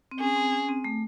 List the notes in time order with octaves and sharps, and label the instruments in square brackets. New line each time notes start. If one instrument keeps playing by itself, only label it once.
[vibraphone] C4
[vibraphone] C#4 [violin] G#4
[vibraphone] C4
C#4
C4
A3